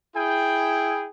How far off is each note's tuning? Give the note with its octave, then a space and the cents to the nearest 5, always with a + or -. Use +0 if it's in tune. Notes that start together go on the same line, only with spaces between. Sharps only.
E4 +0 G#4 +0 G5 +0